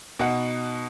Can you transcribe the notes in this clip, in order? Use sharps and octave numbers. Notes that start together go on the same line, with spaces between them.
B2 D#4 F#5